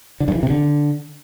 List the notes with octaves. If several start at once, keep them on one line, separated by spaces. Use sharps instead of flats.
D3
G2
E3
C3
D3